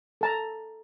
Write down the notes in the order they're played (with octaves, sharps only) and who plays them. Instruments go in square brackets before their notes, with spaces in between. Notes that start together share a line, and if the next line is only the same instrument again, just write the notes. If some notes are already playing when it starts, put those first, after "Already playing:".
[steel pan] A4 A5 A#5